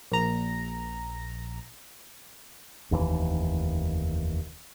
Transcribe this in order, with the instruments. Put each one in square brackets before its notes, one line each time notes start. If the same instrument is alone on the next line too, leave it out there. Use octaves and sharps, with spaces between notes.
[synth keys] A#1 A#5
[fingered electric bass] F1 D#2 A2 E3